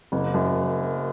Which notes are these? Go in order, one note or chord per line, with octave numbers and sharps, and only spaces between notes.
F#1
F#2